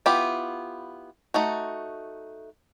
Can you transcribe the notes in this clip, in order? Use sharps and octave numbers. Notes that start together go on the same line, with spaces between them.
B3 E4 F4 G4 B5
A3 D#4 F#4